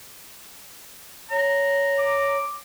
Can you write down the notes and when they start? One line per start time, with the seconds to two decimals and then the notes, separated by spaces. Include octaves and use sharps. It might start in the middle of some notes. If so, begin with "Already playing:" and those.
1.31 C#5 A#5
1.98 D6